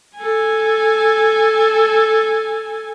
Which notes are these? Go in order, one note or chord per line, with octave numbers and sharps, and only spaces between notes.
A4 G#5